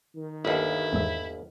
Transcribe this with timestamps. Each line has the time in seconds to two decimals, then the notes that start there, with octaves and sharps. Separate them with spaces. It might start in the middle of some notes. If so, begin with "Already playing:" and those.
0.15 D#3
0.45 G1 D#2 E4
0.93 E2 G#2 E5